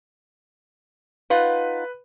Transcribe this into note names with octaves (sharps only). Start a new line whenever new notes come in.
D#4 F4 B4 F#5